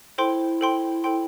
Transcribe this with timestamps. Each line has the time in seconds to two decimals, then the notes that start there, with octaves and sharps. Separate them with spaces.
0.18 E4 A4 C5 G5 C6
0.61 A4 C5 G5 C6
1.04 A4 C5 G5 C6